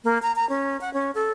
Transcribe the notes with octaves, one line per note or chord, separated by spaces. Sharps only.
A#3
A#5
A#5
C#4
F#5
C#4
A4